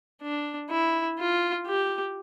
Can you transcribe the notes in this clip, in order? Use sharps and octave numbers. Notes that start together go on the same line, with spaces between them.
D4
E4
F4
G4